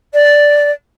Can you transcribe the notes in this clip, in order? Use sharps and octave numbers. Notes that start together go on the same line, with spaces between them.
D5